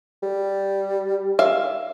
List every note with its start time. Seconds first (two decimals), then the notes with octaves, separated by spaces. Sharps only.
0.23 G3
1.39 E5 F5